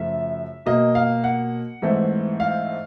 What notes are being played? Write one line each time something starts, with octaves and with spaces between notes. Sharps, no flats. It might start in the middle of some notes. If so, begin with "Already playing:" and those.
Already playing: F#2 C#3 F3 A3 E5
B2 F#3 A#3 D#5
F5
F#5
G#2 E3 A3 C4
F5